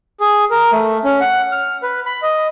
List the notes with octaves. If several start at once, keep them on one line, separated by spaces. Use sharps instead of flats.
G#4
A#4
A3
C#4
F#5
F6
B4
B5
D#5